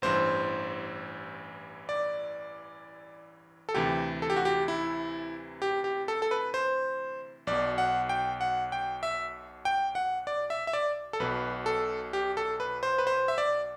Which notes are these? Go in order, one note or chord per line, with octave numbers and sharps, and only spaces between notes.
A1 G2 E3 C5
D5
A4
D2 C3 E3 G4
A4
G4
F#4
G4
E4
G4
G4
A4
A4
B4
C5
B1 B2 D5
F#5
G5
F#5
G5
E5
G5
F#5
D5
E5
E5
D5
A4
B1 B2 B4
A4
G4
A4
B4
C5
B4
C5
E5
D5